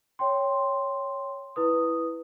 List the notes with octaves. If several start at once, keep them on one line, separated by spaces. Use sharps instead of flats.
C#5 G5 C6
E4 B4 D#6